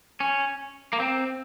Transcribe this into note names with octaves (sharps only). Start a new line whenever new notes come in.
C#4
A#3
C4